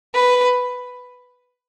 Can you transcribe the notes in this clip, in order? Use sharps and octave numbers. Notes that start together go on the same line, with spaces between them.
B4